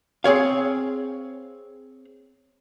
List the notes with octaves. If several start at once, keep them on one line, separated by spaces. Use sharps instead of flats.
C4 G#4 C#5 F5